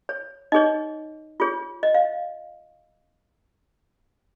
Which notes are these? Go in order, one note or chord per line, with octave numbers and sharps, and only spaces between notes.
C#5
D#4 G#4 C#5 D#5
F4 G#4 C#5
D#5
F5